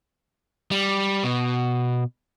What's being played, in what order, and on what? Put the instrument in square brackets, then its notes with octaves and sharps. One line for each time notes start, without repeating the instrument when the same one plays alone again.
[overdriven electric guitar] G3
B2